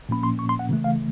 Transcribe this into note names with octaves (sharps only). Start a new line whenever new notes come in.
A#2 F3 A#3 C#4 B5
C6
C#6
C6
F#5
C#3 E3 A3
F5